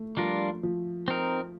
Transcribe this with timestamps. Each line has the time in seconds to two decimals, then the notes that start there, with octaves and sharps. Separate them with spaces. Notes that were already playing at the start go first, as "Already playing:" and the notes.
Already playing: A3
0.17 F3 G3 D4 F4 A#4
0.63 F3
1.08 C4 D#4 A#4